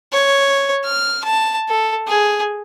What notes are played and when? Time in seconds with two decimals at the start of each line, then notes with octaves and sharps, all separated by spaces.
0.12 C#5
0.84 F6
1.24 A5
1.68 A4
2.07 G#4